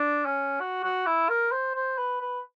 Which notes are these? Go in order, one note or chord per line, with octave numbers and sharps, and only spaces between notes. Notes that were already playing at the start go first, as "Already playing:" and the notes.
Already playing: D4
C#4
F#4
F#4
E4
A#4
C5
C5
B4
B4